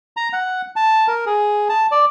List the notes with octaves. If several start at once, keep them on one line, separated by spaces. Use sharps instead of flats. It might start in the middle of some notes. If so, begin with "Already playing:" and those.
A#5
F#5
A5
A#4
G#4
A5
D5